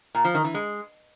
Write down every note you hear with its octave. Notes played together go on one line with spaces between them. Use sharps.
A#2
F3
D#3
E3
G#3